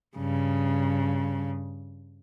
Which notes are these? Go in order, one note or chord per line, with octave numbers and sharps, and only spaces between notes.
G2 C#3